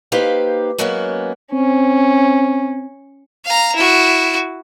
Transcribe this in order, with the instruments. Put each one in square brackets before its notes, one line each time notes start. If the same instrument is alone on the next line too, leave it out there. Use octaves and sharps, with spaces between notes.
[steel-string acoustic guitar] A#3 D#4 G4 B4 C5 F5
F#3 G#3 A#3 B3 C#4 F#4
[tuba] C4 [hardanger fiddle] C#4
[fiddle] F5 A#5
E4 F#4